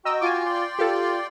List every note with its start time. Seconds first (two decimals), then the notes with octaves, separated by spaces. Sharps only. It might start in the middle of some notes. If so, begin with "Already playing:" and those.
0.05 F#4 D#5 G5 A#5 E6
0.21 F4 G#5 D6
0.46 D5 G5 C6
0.79 F4 G4 A4